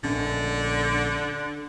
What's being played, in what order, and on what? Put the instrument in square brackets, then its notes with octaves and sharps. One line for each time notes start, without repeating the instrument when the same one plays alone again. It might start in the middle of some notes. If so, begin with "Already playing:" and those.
[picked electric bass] A#1 C#4 [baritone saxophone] D3